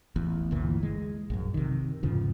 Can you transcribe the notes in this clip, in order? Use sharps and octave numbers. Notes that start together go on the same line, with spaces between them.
A1 E2
G1 D2 A#2 E3
G#3
A#1 F#2
C3 D#3
E2 G#2 C#3 F3